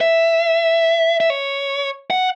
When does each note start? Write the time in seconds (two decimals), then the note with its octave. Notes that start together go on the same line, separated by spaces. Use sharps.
0.01 E5
1.20 E5
1.30 C#5
2.10 F#5